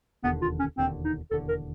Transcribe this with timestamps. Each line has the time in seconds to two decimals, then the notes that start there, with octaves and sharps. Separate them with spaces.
0.24 E1 D#2 D3 B3
0.42 F4
0.59 C#4
0.78 E1 D#2 D3 C4
1.04 D#4
1.31 E1 D#2 D3 A4
1.48 A#4